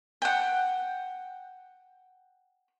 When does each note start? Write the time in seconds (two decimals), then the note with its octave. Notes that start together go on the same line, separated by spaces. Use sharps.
0.22 F#5 G5